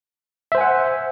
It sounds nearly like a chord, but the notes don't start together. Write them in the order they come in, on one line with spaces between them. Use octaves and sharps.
E5 C5 G#5 F#5